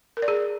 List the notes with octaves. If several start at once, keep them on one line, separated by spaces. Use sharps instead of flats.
A#4
D5
G#4